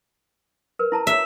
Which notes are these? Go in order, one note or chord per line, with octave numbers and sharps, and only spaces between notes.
A#4 B4
E4 A5 A#5
E5